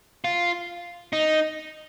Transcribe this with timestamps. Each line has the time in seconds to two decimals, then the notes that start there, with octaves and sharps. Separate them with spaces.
0.24 F4
1.13 D#4